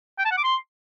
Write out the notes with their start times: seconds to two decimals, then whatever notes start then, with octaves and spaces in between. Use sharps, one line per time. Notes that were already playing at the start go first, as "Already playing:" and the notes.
0.19 G5
0.25 A5
0.31 F#5
0.37 D6
0.44 C6